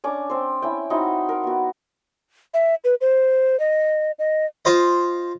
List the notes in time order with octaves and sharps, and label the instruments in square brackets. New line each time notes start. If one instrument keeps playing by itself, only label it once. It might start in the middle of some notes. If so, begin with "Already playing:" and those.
[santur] C#4 D4 D6
C4 C5
C#4 E4 G5
C4 D#4 E4 F#4
A#4
B3 F#4
[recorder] E5
B4
C5
D#5
D#5
[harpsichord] F4 C5 D#5